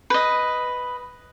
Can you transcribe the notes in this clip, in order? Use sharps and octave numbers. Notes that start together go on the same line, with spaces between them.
B4 D#5